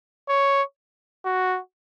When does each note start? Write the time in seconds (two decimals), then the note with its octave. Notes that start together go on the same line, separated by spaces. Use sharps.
0.29 C#5
1.25 F#4